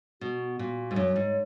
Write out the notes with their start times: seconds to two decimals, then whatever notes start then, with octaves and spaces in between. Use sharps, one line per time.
0.21 B2 F#4
0.59 A#2 F#4
0.91 G#2
0.96 F#2 C#5
1.16 G#2